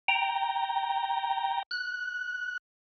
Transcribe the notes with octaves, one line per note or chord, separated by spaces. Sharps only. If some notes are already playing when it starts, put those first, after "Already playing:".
G5 A#5
F#6